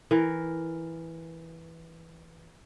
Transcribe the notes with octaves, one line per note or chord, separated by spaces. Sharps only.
E3 A#4